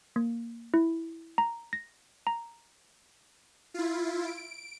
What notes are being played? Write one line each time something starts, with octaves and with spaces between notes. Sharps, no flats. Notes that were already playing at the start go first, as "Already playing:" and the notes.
A#3
E4
A#5
A#6
A#5
E4 F4
D7